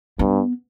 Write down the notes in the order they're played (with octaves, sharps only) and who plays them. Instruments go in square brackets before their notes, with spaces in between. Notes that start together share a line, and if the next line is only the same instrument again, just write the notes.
[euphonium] G2 [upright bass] B3